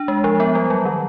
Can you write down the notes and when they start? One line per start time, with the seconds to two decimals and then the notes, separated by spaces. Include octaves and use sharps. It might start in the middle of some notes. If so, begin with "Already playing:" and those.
Already playing: D4
0.08 G#3
0.24 F3
0.40 B3
0.55 G3
0.70 F#3
0.85 D#3